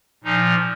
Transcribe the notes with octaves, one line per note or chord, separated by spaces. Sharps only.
A#2 F3 D#4